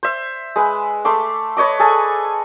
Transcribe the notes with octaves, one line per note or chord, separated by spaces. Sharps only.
C5 E5
G#3 B4
A3 C6 D6
B4 C#5 D#5 D6
G#4 A4 G#5